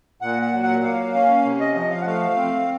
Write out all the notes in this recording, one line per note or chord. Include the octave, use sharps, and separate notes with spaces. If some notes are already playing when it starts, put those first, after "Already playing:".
A#2 F#5
F#5
F#3
F#5
A#3 F5
C#4
C3
D#5
F3 D#5
F5
F#5
A3 F5
C4